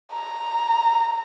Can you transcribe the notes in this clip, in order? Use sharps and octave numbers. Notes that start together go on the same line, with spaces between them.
A#5